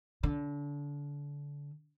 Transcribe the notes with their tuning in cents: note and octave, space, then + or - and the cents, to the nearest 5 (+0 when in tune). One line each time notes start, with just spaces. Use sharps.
D3 -30